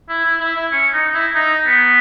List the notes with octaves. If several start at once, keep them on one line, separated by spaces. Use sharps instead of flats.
E4
E4
E4
E4
C#4
D#4
E4
D#4
B3